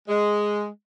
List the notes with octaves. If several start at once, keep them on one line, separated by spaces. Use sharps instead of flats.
G#3